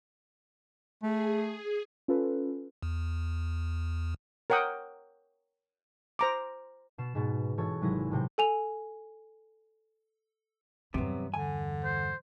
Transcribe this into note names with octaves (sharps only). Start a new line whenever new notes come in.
A3 G#4
C#4 F4 A4 B4
E2
A#4 C#5 F#5 G5 D#6
C5 A#5 D6
B2 C7 E7
G#2 B2
B2 E3 A4 C#5
G#1 C3 F#3 E4 G#4 A#6
A2 C3 G5
A4 G#5 F7
E2 G2 C3 F#3 B3
D3 G#5
C5